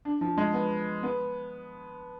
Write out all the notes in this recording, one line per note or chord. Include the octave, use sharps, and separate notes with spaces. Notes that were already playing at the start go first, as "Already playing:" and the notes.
D4
F3
G#3
B3
B3